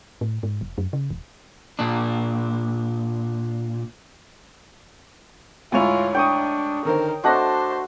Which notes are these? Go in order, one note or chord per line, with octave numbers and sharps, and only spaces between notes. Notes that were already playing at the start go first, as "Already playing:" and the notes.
A2
G#2
F1
F#2
C#3
D#1
A#2 D4
D2 G#2 E4 F4 C#5 G#5 F7
D4 G5 C#6 D#6
D3 D#3 A#4 C5
A3 D4 F#4 C5 D#5 A5 F#6 A#6